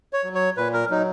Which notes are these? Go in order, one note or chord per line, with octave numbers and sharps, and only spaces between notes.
C#5
F#3
C#5
A#2 B4
A#4
F#3 D#4